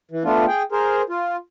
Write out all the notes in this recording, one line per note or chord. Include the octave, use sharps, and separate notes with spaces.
E3
A3 B3 D4 F4
G#4 G5
G#4 A#4 C5
F4